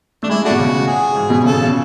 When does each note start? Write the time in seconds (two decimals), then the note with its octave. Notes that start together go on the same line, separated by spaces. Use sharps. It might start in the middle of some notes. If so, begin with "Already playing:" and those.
0.23 A3 D4
0.29 G#3 E4
0.45 A3 D4 F#4
0.50 B2
0.59 C#3
0.87 G#4
1.15 G#2
1.30 B2
1.44 C#3 A4
1.53 B2
1.62 C#3